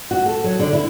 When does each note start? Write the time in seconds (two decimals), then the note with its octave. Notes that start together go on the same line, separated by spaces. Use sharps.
0.11 F#4
0.26 A4
0.44 F#3
0.59 D3
0.73 E4